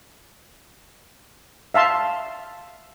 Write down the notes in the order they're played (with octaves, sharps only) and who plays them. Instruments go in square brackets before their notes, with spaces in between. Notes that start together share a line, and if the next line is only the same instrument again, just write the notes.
[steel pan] E5 F5 A5 C6